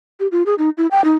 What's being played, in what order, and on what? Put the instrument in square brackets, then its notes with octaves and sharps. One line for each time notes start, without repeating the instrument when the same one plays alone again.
[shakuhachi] G4
F4
G#4
D#4
E4
G5
D#4